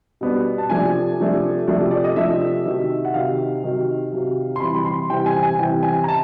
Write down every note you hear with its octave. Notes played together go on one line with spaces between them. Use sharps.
B2 G3 B3 D4
A5
C3 F3 A3 D4 G#5
C3 F3 A3 D4
C3 F3 A3 D4
D5
D#5
C3 F3 A3 D4 E5
C3 D#3 F#3
F#5
C3 D#3 F#3 F5
C3 D#3 F#3
C3 D#3 F#3
C6
C3 E3 G3 C4 B5
B5
C6
C3 E3 G3 C4 G5
G#5
G#5
C3 E3 G3 C4 G5
G#5
A#5
C3 A5